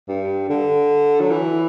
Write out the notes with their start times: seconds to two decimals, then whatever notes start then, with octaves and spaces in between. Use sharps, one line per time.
0.08 G2
0.50 D3
1.20 F#3
1.30 E3